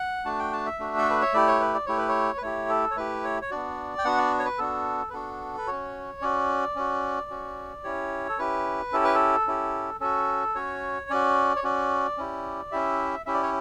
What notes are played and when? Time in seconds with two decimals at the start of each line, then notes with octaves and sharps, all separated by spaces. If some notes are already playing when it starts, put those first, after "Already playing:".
Already playing: F#5
0.25 A3 D4 F#4 A5
0.39 G5
0.53 A5
0.66 E5
0.79 A3 D4 F#4
0.98 A4
1.10 B4
1.21 C#5
1.33 A3 E4 G4 D5
1.47 C#5
1.60 B4
1.74 D5
1.86 A3 E4 G4 C#5
1.97 B4
2.09 C#5
2.38 B4
2.42 A3 E4 G4 C#5
2.69 A4
2.91 C#5
2.96 A3 E4 G4 B4
3.24 C#5
3.42 C#5
3.51 B3 D4 F#4 D5
3.98 G5
4.05 B3 D4 F#4 F#5
4.18 D5
4.39 C#5
4.45 B4
4.59 B3 D4 F#4 A4
5.10 B4
5.13 B3 D4 F#4 A4
5.58 B4
5.67 C#4 F#4 C#5
6.21 C#4 F#4 D5
6.76 C#4 F#4
7.30 C#4 F#4
7.84 C#4 E4 G4 C#5
8.29 A4
8.38 C#4 E4 G4 B4
8.92 C#4 E4 G4 A4
9.04 B4
9.15 A4
9.47 C#4 E4 G4
10.00 C#4 F#4 A4
10.55 C#4 F#4 C#5
11.10 C#4 F#4 D5
11.56 C#5
11.64 C#4 F#4 D5
12.18 C#4 E4 G4
12.71 C#4 E4 G4 E5
13.26 C#4 E4 G4 E5
13.34 D5
13.43 C#5